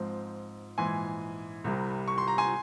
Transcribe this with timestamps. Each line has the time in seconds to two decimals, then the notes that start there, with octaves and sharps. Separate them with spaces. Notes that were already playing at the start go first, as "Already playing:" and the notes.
Already playing: G#2 F3 C4
0.78 A#1 G#2 E3 G#5 C6
1.64 C2 C3 G3
2.08 C#6
2.18 C6
2.28 A#5
2.38 G#5 C6